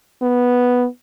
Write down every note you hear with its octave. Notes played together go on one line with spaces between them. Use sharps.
B3